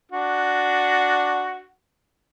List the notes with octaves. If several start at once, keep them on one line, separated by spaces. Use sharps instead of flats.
D4 F#4